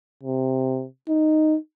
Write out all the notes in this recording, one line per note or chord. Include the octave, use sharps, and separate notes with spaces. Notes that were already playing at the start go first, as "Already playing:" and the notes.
C3
D#4